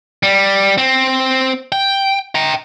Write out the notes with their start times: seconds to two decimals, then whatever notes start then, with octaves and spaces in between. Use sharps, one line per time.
0.23 G3
0.78 C4
1.72 G5
2.35 G5 A#5